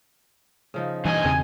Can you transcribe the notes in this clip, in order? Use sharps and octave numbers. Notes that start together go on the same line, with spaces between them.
C#3 F3 D#4
G2 B2 E3 C5 D#5 G#5
E2 C#3 C4